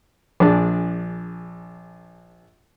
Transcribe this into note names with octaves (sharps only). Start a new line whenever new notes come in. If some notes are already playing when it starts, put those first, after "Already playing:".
A#1 D4 G#4 D5